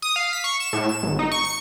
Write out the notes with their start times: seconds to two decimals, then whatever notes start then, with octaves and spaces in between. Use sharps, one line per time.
0.02 D#6
0.16 F5
0.33 B6
0.44 C#6
0.60 E7
0.73 A2
0.89 E7
1.03 G#1
1.19 D#4
1.32 C#6
1.45 C#7